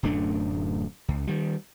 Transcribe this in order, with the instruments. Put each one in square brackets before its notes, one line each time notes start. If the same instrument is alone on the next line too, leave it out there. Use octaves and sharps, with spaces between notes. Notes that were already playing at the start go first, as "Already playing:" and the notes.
[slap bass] D1 F#2 A3 D4
C#2
D#3 G3